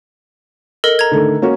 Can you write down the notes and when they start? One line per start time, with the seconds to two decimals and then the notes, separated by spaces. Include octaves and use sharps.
0.84 A4 A#4 D#5
0.99 A#5 G#6
1.11 D3 D#3 A3
1.42 A#3 C#4 F#4